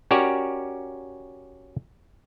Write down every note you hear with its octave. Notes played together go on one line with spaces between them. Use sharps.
C#4 F#4 G4 A#4 C#5 D5